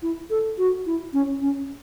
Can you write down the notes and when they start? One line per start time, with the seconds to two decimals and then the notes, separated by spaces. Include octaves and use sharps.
0.02 E4
0.30 A4
0.58 F#4
0.86 E4
1.13 C#4
1.42 C#4